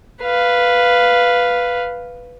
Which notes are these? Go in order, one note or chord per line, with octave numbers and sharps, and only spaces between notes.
B4 F5